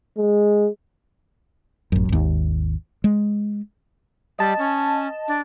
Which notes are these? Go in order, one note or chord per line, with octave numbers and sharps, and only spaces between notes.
G#3
A1 F#2
G#1 D#2
G#3
G3 D#5 A5
C#4
D4